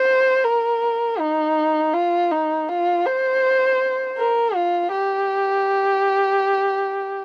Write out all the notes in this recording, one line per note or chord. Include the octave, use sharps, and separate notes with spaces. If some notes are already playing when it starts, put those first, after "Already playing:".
Already playing: C5
A#4
D#4
F4
D#4
F4
C5
A#4
F4
G4